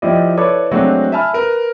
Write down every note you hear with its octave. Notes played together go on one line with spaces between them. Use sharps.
F3 E4 G4 D5 D#5
E4 A4 B4 C#5 D5 D6
F#3 G#3 A3 C4 D4 F#4
E5 G#5 A5 B5 F6
A#4 B4